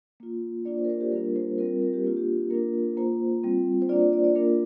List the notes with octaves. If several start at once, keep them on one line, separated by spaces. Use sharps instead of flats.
A#3 F4
A#3 D4 F4 D5
C5
A#4
C5
G4
G3 A#3 D4 F4 A#4
C5
G3 C4 F4 A#4
A#4
G4
A#3 D4 F4
G4
A#3 D4 F4 A#4
A#3 F4 C5
G3 C4 F4
C5
A#3 D4 F4 D5
D5
D5
D5
A#3 D4 F4 A#4